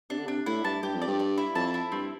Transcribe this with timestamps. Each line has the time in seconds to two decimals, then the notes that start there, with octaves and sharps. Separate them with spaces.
0.10 C3 D4
0.19 D3
0.27 C3 D4
0.46 A2 E4
0.64 G2 A5
0.83 G2 G4
0.95 F2
1.01 D5
1.08 G2
1.20 D5
1.38 E4
1.55 F2 A5
1.74 E4
1.92 G2 C4